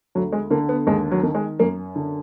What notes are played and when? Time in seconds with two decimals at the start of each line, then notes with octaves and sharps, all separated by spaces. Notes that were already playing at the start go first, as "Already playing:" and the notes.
0.15 D2 F#3
0.32 G#3
0.50 D3 A#3
0.69 B3
0.87 D#2 G#3
1.11 F#3
1.23 D#3
1.35 G#3
1.59 F#2 A#3
1.96 D3